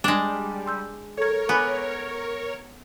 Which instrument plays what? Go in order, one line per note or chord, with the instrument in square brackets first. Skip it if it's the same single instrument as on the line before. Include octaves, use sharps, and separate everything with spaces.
[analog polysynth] G3 [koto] G#3 D4
[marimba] C6 E6 G6
[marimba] A4 G#6 [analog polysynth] A#4 C#5
[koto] B3 [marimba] G#5 B5 D6